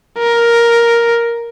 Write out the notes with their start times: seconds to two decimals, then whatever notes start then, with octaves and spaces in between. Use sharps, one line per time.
0.18 A#4